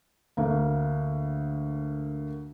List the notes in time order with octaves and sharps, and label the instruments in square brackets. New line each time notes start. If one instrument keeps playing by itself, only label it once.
[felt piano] D2 A#3